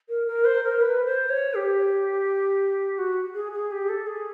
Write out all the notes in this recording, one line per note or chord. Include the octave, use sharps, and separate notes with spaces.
A#4
A#4
C5
A#4
B4
C5
C#5
G4
F#4
G#4
G#4
G4
A4
G#4